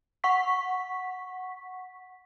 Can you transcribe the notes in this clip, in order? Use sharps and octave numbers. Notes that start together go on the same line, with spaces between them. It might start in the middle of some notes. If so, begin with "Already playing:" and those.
F#5 C#6 B6